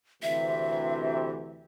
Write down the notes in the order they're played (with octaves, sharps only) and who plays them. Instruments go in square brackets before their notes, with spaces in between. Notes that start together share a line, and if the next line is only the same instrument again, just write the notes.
[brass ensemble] D2 C3 E3 [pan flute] E5